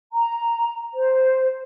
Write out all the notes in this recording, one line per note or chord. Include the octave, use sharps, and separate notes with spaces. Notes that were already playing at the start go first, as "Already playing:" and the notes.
A#5
C5